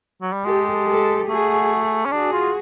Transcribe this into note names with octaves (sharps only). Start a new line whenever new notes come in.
F#3
G3
G#3 G4 A4
G4 A4
A3 F#4 G#4
C#4
D4 F#4 G#4
F4